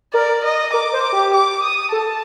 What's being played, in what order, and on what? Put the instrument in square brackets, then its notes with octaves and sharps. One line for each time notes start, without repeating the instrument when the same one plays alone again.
[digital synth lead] A#4 [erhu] D5
[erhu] D#5
[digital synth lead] A#4 [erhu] D6
[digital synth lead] C5
[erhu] D6
[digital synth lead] G4
[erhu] D6
D#6
[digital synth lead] A4 [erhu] A5